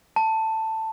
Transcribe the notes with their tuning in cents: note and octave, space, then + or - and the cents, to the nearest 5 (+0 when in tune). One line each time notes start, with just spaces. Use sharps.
A5 +10